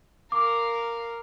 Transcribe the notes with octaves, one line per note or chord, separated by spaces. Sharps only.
A#4 F5 D6